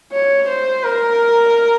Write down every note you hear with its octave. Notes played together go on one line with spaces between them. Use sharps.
C#5
C5
A#4